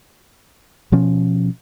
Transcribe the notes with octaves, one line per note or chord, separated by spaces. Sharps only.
B2 F3 C#4